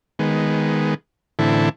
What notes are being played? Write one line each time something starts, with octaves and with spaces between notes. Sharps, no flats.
D#3 G#3 B3
A2 D3 E3 C4 E4 A4